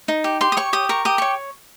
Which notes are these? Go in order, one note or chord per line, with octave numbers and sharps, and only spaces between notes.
D#4
G4
G4 C6
D#6
C#5 C#6
G4 D#6
A#4 C#6
G4 D#6
C#5 C#6